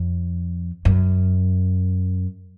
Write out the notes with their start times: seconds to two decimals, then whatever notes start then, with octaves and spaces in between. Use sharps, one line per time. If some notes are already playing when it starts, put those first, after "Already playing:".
Already playing: F2
0.85 F#2